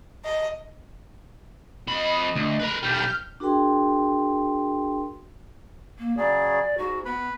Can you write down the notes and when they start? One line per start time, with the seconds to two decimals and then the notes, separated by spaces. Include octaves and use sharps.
0.25 D#5
1.87 F2 D#5 B5
2.35 D2
2.60 A#4 B4
2.83 B1 G3 F6 G6
3.40 D4 F#4 G#4 A#4 G5 C6
5.99 A#3
6.17 C#3 F#3 G#4 D5
6.78 G#2 F#4
7.05 B3 B4 B5